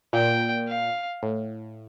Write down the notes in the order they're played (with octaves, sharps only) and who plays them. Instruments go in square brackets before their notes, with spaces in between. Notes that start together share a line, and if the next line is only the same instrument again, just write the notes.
[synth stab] A#2 [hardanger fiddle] G5
[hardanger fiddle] F5
[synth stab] A2